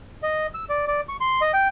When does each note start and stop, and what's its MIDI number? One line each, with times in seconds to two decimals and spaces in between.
0.23 0.47 75
0.54 0.65 88
0.69 0.85 74
0.87 1.01 74
1.09 1.17 85
1.20 1.41 84
1.41 1.52 75
1.53 1.68 79